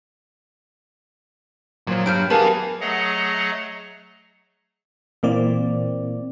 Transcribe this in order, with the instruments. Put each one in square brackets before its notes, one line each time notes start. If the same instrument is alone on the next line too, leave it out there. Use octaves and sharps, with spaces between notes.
[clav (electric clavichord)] A#2 F3 [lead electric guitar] F#3
[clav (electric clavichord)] G2 [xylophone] F6 G6 D7
[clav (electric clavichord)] B3 [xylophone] G4 A5 [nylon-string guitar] G#4 A#4 F5 [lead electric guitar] B4 G#5
[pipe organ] F#3 A3 G#4 D#5 F#5 A#5
[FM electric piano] A#2 E3 A#3 C4 D5